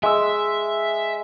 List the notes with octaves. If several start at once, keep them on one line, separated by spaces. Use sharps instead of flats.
G#3 E5 E6